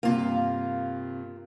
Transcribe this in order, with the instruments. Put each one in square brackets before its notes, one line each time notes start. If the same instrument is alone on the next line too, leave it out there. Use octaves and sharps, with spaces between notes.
[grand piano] G2 C3 [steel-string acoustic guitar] A#3 F4